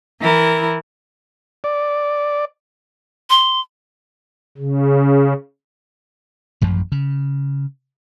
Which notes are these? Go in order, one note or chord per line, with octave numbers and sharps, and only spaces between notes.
E3 E4 A#4
D5
C6
C#3
A1 F#2 F3
C#3